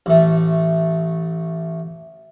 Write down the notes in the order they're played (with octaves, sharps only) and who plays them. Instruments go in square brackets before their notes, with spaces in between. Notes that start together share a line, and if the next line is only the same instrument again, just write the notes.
[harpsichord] A1 A3